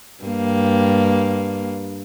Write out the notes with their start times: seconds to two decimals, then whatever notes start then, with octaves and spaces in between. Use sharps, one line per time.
0.24 G2 A#3